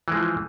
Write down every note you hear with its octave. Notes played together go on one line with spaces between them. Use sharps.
E3 F3 G#3